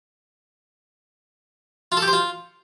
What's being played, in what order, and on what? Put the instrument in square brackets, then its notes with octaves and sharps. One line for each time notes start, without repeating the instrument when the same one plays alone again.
[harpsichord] F4
A4
G4
C5
F4